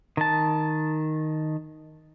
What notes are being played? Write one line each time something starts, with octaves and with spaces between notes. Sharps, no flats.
D#3 A5